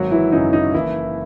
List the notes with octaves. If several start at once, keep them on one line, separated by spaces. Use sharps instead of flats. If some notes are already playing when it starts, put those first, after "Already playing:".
Already playing: G#1 F#3 F#4
E3 E4
F#2 C#3 D#4
D#4
F#1 E3 E4